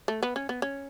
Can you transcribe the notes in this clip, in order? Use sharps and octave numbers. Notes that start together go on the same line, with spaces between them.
A3
B3
C#4
B3
C#4